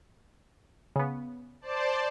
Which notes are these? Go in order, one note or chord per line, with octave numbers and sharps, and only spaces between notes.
C#3 B3
C5 D5 A5